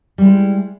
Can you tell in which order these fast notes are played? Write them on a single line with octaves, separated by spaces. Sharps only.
G3 G#3 E4